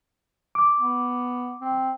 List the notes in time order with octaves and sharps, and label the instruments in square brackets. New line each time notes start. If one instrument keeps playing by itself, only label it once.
[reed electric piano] D6
[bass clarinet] B3
C4